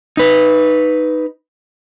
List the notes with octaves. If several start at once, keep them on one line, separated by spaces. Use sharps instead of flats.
D#4 B4